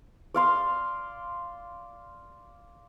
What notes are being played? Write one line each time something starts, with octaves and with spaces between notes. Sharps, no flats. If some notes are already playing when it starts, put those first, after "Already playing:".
D5 F5 C6